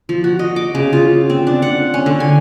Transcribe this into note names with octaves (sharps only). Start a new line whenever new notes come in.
F3
F#4
D#5
D6
C#3
F4
C4
D4
F#5
C#4
D3
G#5